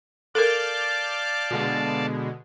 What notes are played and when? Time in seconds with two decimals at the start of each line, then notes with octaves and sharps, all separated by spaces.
0.35 A4 A#4 D5 F5 A5 D6 F6 G6
1.51 B2 D3 G#3